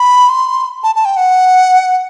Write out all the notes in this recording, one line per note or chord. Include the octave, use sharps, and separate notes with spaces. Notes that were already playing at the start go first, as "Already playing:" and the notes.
Already playing: B5
C6
A5
A5
G5
F#5